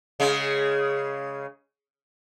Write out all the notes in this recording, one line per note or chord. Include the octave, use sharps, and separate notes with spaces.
C#3 G#3